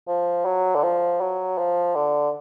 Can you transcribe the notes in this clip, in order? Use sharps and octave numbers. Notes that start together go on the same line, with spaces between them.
F3
F#3
D3
F3
F#3
F3
D3